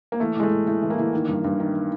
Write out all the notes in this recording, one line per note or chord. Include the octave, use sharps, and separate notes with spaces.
A#3
E3 A3
A2 G#3
A3
A2
A2 A3
E3
A#3
E3
D#3
G2
G2
D#3